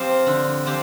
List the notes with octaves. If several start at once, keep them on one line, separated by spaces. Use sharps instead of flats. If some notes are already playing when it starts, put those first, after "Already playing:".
Already playing: F3 C4 G4
D3
F3 C4 G4